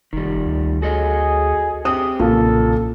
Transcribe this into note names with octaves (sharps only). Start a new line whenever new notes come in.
F1 D#3 G3
D2
F#4 G#4 A4 D#5
C4 G4 D#6
B1 F2 A#2 C#3 A4